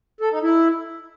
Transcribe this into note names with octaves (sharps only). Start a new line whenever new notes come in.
A4
D#4
E4